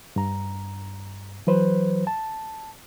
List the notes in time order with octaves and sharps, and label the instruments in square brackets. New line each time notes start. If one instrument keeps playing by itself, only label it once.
[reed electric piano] G2 A#5
E3 F#3 B4 C5
A5